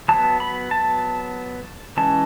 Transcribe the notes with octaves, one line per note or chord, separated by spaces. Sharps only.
F#3 B3 A5
B5
A5
E3 G#3 C#4 A5